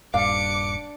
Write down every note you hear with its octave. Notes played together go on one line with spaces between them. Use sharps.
D#1 G2 D4 F5 D6 C#7